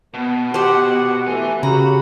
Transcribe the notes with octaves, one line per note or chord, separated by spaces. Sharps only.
B2 B3
F#4 G4 C5 F#5
E3 A3 B4 G#5
C#3 F#4 G4 A#5 B5